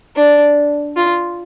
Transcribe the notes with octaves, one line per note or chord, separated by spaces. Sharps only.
D4
F4